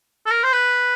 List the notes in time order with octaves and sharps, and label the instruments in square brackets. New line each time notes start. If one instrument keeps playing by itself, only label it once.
[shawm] A4
A#4
C5
B4